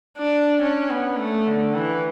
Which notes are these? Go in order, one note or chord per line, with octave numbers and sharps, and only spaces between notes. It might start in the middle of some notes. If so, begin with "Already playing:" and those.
D4
C#4
B3
A3
D3
E3